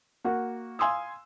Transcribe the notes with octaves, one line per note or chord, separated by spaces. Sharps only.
A#3 F#4 F#5
F5 G#5 C6 D#6 E6